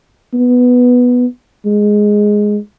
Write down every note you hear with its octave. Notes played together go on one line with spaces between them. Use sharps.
B3
G#3